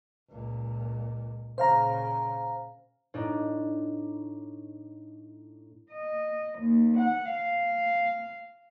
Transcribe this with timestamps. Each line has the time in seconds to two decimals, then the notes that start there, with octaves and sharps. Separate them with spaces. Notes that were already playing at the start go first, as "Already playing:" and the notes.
0.30 C#2 A#2
1.58 A#2 C#3 C5 F5 A#5
3.14 A2 D4 D#4
5.93 D#5
6.60 D#2
6.98 F#5
7.31 F5